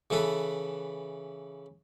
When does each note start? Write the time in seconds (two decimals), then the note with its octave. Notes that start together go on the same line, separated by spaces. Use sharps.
0.10 C#3 E3 A4 B4